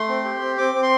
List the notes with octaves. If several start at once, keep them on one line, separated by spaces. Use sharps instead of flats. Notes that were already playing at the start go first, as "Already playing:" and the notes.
Already playing: A3 C6
C4
G4
C4
C4 D6
C4
C6